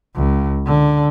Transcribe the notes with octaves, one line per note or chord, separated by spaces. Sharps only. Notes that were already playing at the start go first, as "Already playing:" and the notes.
C#2
D3